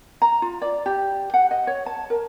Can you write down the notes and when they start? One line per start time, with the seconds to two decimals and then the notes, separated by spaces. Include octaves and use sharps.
0.22 A#5
0.42 F4
0.62 D5
0.86 G4
1.34 F#5
1.51 D#5
1.67 C#5
1.86 A5
2.10 A#4